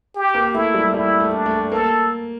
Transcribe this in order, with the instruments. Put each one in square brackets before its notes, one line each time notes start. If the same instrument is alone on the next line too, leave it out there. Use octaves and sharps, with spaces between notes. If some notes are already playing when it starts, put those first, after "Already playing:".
[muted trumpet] G4
[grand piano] A#3
[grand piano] A3 [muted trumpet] E4
[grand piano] G3
[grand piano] G3 [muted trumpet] E4
[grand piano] A3
[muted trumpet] D4
[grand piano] A3
[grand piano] A#3 [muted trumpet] A4